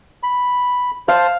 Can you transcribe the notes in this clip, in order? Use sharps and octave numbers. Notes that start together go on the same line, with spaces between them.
B5
C5 F5 A5